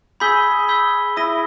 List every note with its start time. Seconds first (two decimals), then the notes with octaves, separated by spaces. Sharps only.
0.20 G#4 B5 E6 G6 B6 G7
0.68 B5 E6 G6 B6 G7
1.16 E4 D#6 A#6 D#7 G7